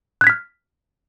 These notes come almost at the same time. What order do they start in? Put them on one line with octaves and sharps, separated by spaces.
F#6 G#6 B6 F6